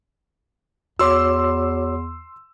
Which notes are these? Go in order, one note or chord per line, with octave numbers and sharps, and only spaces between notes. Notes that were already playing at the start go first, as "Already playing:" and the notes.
E2 F#4 C#5 C6 D6 E6